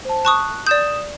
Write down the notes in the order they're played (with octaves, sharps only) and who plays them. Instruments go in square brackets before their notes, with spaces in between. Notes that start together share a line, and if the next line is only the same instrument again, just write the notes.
[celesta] C5 A5
[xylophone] A5 C#6 D#6 [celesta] F#6
[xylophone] D5 G6 [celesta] D#6 E7